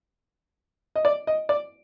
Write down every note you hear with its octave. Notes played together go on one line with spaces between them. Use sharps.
D#5
D5
D#5
D5